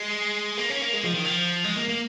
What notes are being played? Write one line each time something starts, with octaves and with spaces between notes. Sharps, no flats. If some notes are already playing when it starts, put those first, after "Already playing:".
Already playing: G#3
A#3
C#4
A#3
G#3
F3
D#3
F3
G#3
A#3
A#3